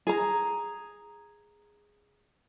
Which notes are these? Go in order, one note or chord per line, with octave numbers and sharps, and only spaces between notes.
G#4 A#5